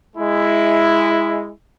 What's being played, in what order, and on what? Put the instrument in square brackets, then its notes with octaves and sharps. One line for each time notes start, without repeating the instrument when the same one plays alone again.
[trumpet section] G#3 E4